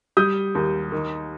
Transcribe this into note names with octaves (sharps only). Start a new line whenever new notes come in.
G3 D#6 G6
D#2
D#3